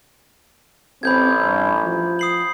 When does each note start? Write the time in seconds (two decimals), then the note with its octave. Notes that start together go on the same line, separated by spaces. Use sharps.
1.03 A1 C4 B5 G6 G#6
1.42 G2
1.84 F3
2.19 D#6 C7 F#7